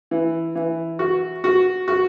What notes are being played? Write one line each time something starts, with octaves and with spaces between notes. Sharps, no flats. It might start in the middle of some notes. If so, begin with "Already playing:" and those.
E3
E3
F#4
F#4
F#4